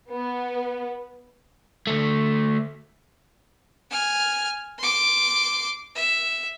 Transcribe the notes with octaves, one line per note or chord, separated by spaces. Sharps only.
B3
D2 A3
G#5 F6
C6 D6
E5